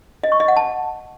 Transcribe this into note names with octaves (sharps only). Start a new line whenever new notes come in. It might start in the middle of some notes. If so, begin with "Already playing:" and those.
D#5
C#6
D#5
F#5
A5